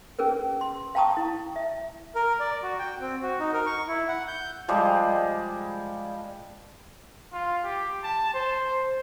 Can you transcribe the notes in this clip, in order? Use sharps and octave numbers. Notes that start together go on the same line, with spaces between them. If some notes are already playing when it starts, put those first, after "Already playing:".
C#4 G#4 A#4 B4
C6
F5 G5 A5 A#5 C#6 D#6
E4
E5
A#4
D5
F#4
G5
C4
F#4
D#4
A#4
C#6
E4
F#5
G6
F3 G3 G#3 G4
F4
G4
A5
C5